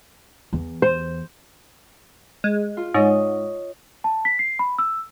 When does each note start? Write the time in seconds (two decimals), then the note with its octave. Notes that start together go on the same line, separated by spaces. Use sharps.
0.53 E2
0.82 C5
2.44 G#3
2.77 F4
2.94 G#2 C#5 D#5
4.04 A5
4.25 B6
4.39 C7
4.59 B5
4.78 E6